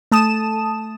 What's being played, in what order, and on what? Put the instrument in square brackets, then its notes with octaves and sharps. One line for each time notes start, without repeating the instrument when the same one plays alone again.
[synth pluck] A3 A5 D#6 E7